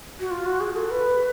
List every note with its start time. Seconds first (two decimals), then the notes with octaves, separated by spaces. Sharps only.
0.20 F#4
0.31 F4
0.46 F#4
0.61 G#4
0.76 A4
0.91 B4